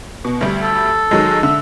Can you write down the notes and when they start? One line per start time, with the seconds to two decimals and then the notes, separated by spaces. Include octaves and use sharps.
0.25 B2
0.41 D2 G3
0.62 A4
1.11 D#3 F#3 G#3
1.43 D3 E5